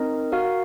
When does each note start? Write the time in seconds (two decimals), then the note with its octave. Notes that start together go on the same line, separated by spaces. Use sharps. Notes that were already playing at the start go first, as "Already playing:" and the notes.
Already playing: C4 D#4 A#4 D#5
0.32 F#4 A#4 F5